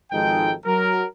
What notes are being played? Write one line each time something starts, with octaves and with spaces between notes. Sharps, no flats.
G#1 F3 G#3 D#4 A4 G5
F#3 A#4